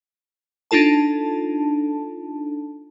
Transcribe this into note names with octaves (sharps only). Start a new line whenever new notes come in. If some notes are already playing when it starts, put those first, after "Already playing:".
D4 D#4 F4 A4 A5